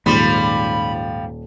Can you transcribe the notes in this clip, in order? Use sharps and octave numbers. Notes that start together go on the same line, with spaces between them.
D#1 G#2 F3 G3 B5